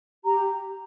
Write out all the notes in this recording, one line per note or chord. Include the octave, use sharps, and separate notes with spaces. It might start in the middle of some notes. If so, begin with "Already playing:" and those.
G4 A#5